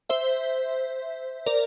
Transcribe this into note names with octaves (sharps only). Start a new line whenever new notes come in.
C5 E5
A#4 D5